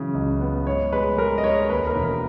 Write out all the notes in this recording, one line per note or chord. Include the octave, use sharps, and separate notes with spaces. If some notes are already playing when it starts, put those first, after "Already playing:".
Already playing: C#3 E3 F#3
C#2
B3
G#2 C#5
G#3 B4
G#3 A#4
D#5
G#3 C#5
D#2 B4
A#4
E1
A#4